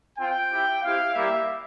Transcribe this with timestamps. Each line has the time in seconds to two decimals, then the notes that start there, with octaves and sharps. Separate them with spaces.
0.18 C4 F4 G5
0.50 C4 E4 G4
0.82 C4 E4 G4 F5
1.14 G3 A#3 E4 G4 E5